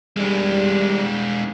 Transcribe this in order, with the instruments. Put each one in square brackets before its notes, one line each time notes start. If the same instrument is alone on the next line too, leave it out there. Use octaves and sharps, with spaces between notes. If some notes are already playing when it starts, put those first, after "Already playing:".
[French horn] G3 [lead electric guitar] G#3 D4